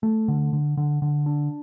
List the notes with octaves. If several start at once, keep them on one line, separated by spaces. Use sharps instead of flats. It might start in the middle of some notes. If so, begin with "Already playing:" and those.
A3
D3
D3
D3
D3
D4